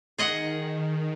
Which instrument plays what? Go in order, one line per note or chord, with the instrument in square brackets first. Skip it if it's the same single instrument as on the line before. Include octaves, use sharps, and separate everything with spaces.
[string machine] D#3 [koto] G#4 D#5 F#5